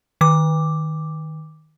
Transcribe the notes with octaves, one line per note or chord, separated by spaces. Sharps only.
D#3 D6